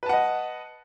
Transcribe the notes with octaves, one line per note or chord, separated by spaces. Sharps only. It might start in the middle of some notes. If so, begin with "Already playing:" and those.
B4 D#5 F#5 A5